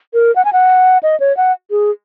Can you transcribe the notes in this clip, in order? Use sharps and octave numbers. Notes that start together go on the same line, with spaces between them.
A#4
F#5
G#5
F#5
D#5
C#5
F#5
G#4